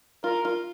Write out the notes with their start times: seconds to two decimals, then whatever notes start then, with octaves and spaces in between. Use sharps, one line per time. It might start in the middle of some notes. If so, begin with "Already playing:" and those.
0.24 F4 A#4
0.45 F4